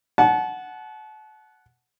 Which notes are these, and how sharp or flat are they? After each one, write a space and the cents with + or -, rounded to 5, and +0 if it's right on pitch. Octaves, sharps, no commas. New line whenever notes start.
F#5 +0 A5 -35